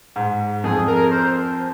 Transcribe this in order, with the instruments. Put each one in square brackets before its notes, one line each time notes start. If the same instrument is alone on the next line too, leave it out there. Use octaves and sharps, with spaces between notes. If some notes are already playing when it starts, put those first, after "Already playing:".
[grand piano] G#2
[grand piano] F2 [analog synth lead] G#4
[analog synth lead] A#4
C5